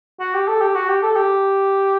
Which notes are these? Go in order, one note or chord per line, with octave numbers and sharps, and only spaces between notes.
F#4
G4
A4
G4
F#4
G4
A4
G4